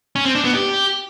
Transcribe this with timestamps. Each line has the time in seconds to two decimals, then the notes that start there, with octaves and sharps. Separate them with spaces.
0.16 C#4
0.25 C4
0.35 D4
0.45 B3
0.55 G4